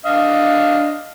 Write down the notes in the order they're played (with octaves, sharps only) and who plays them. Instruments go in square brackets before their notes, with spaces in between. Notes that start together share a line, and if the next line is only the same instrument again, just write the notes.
[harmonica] D4 D#5 F5